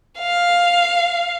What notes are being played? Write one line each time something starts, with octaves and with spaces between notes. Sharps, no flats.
F5